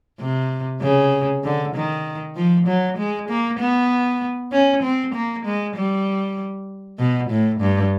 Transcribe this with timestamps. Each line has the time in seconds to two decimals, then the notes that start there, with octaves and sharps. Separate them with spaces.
0.20 C3
0.82 C#3
1.44 D3
1.75 D#3
2.36 F3
2.67 F#3
2.97 G#3
3.29 A#3
3.60 B3
4.52 C#4
4.83 C4
5.14 A#3
5.45 G#3
5.76 G3
6.99 B2
7.30 A2
7.60 G2